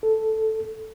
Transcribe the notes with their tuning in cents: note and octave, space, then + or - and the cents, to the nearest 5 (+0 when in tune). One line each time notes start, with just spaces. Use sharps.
A4 +0